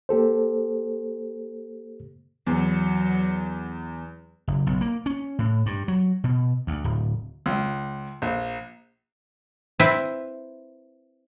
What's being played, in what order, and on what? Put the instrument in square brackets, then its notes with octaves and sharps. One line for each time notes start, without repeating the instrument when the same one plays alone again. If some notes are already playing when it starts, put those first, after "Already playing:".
[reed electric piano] A#3 G4 A4 C5
[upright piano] E2 [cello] F#3
[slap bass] F#1
B1
A#3
C#4
A2
G2
F#3
B2
D2
D1
[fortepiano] C#2
A#1
[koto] C4 E4 B4 E5